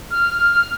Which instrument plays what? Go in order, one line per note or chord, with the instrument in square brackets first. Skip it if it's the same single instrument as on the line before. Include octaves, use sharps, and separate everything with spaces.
[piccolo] F6